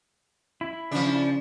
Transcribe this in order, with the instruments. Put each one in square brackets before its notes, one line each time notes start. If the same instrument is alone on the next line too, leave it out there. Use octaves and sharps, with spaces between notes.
[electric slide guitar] E4
[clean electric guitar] C#3 [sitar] F3 D4